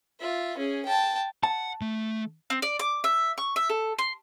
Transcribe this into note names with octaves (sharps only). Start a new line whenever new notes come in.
F4 E5
C#4 G#4
G5 A5
F#5 A5
A3
C4
D5
D6
E5
C#6
E5
A4
C6